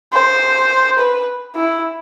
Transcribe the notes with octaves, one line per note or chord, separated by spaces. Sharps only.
C5
B4
E4